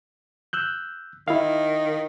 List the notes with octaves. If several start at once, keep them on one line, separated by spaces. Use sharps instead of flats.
E6 F#6 G6
D#3 E4 F5